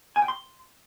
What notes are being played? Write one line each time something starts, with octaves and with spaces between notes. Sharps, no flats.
G#5
G5
C6